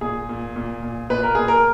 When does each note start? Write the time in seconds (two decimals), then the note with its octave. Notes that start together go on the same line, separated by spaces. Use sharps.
0.01 A#2 G#4
0.29 A#2
0.56 A#2
0.82 A#2
1.10 A#2 B4
1.23 A#4
1.35 A#2 G#4
1.48 A#4